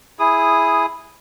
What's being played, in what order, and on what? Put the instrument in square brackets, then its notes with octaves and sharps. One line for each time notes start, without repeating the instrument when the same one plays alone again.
[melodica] E4 G#4 D#6